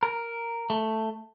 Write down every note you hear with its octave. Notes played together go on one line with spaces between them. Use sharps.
A#4
A3